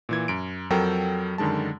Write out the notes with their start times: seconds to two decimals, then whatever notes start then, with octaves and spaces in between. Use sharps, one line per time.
0.09 A#2 E3 G#6
0.28 F#2 D7
0.70 F2 F#3 A4 A#4 G5
1.38 F#2 D3 D#3 G#3 A5